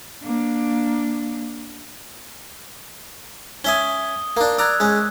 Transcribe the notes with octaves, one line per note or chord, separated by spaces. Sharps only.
A#3 D4
C#4 E5 G#5 D#6 G7
A#3 D4
D5 A#5 E6 F#6 G#6
G#3 C#4